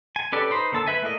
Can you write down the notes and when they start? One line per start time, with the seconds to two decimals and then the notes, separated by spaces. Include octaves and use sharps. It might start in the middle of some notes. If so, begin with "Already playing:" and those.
0.16 G#5
0.32 C#4 G4 A4 B4 D5
0.50 D#4 B4 C5
0.72 D3 A#3 A5 E6
0.86 B4 E5 G#5
1.02 A3 A#3 E4 D5 D#5